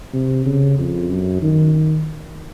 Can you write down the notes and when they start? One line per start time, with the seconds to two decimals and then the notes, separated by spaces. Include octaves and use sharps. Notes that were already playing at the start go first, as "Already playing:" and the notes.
0.13 C3
0.46 C#3
0.78 F2
1.09 F#2
1.42 D#3